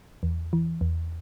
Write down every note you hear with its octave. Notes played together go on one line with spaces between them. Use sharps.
E2
E3
E2